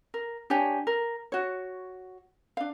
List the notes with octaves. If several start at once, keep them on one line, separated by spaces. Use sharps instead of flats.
A#4
D4 G4 C#5 G#5
A#4
F#4 C#5
D4 F5